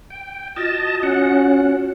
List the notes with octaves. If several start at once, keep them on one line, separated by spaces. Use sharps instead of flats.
G5
F4 F#4 D#5 A5
C#4 F#5